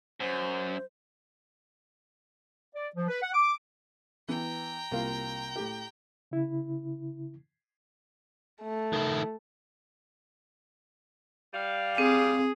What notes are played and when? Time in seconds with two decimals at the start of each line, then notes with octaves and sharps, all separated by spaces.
0.20 F#2 C5
2.75 D5
2.95 F3
3.08 B4
3.22 F#5
3.34 D6
4.28 E3 B3 G5 A#5
4.91 C2 A#3 F4
5.56 A2 G4
6.31 C#3 E4
8.62 A3
8.93 D#3 E4
11.53 G3 F5
11.98 C4 G#4